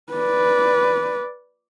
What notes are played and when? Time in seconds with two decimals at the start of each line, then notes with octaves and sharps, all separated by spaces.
0.13 B4 D5